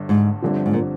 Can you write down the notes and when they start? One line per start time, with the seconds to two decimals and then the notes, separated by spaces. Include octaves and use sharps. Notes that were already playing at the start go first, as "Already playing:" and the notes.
Already playing: G1 G2 D3
0.09 G#2
0.42 G1 G2 D3 F3 C4
0.66 G#2
0.73 A#2